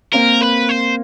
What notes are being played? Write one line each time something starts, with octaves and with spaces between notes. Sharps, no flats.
A#3 C4 A#4
B4
C5